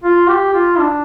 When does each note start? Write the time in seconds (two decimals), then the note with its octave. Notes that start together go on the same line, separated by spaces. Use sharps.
0.04 F4
0.29 G4
0.54 F4
0.79 D4